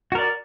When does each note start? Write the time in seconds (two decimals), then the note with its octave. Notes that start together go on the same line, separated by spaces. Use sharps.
0.12 F#4
0.15 A#4
0.18 D5